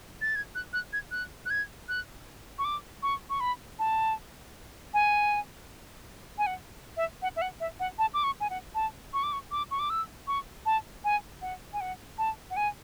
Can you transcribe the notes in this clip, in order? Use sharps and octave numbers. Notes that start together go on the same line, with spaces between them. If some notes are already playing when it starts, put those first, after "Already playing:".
A6
G#6
F#6
F#6
G#6
F#6
F#6
G#6
F#6
C#6
D6
C#6
C#6
B5
A5
G#5
G#5
F#5
E5
F#5
E5
F#5
E5
F#5
A5
D6
C#6
G#5
F#5
A5
C#6
D6
C#6
D6
C#6
D6
E6
C#6
A5
G#5
F#5
G#5
F#5
A5
F#5
G#5